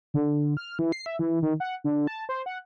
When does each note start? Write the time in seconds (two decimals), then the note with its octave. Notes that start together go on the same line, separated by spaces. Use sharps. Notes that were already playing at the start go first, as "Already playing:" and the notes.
0.14 D3
0.57 F6
0.79 E3
0.92 C7
1.06 E5
1.19 E3
1.42 D#3
1.60 F#5
1.84 D3
2.07 A5
2.29 C5
2.46 F#5